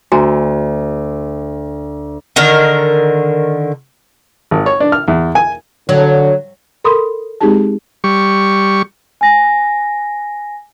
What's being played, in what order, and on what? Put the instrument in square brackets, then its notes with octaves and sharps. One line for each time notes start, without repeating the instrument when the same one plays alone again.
[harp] D2 [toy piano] F#4 G#5 A#5
[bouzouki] D3 D#3 A#4
[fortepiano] G#1
C#5
D4
F6
E2
G#5
[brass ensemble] D3 [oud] F#3
[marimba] A4 A#4 B5 C6 D#6
G#3 C4 D#4 G4 G#4 A5
[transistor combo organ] G3 C#6
[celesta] G#5 A#6